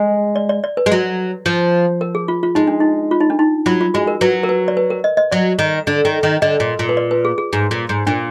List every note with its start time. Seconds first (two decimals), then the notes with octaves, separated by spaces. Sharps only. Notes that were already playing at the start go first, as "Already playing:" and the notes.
Already playing: G#3
0.36 D5
0.49 D5
0.64 D5
0.77 B4
0.86 G#3
0.91 F#3
1.46 F3
2.01 A#4
2.15 G#4
2.28 F4
2.43 F4
2.55 G#3 D#4
2.67 D4
2.80 D#4
3.11 F4
3.20 D#4
3.30 D4
3.39 D#4
3.66 F#3 F4
3.81 F4
3.94 G#3 F#4
4.07 A#4
4.21 F#3 B4
4.43 A#4
4.49 B4
4.68 D5
4.77 B4
4.90 A#4
5.04 D#5
5.17 D#5
5.32 F#3 D5
5.59 D#3
5.87 D3
6.05 D#3
6.23 D#3
6.42 D3 D#5
6.60 A#2
6.79 A#2
6.89 B4
6.97 D5
7.11 B4
7.25 G#4
7.38 G#4
7.53 G#2
7.71 A#2
7.89 G#2
8.07 A#2 D4